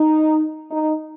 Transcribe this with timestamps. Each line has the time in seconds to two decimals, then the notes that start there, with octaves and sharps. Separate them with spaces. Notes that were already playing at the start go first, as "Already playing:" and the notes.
Already playing: D#4
0.71 D#4